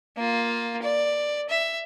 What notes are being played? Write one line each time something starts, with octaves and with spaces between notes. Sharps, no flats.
A#3 F4
D5
E5